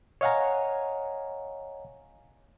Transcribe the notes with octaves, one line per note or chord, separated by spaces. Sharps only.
C#5 D#5 F5 F#5 G#5 A#5